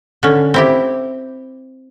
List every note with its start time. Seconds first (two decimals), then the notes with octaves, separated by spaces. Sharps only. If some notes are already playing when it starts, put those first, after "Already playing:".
0.23 D3 C#4
0.54 C4 E4 G4